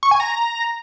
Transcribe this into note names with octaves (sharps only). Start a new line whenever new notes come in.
C#6
G#5
A#5